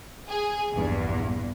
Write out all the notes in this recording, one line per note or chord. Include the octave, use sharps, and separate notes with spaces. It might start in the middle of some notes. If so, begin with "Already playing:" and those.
G#4
A#1 E2 G2